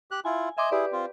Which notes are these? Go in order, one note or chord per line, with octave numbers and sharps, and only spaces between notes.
G4 F#6
E4 F4 G#5
D#5 E5 G#5 C6 D6
E4 G4 G#4 B4 D5
C4 F4